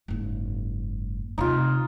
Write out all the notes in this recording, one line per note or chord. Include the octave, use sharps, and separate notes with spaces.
F#1 G#2
D2 C3 D#4 F4